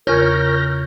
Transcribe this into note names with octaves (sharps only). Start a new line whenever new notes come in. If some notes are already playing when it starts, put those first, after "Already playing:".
E2 C#3 F4 A#4 C#5 F6 G6 A#6